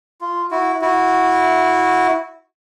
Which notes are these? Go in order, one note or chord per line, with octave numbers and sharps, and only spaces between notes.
F4
E4 F#4
E4 F#4